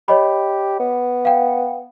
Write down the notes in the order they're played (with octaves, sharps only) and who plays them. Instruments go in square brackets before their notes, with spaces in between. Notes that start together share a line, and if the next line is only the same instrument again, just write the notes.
[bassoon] G4 [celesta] C#5 D#5 B5
[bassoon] B3
[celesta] F5 G5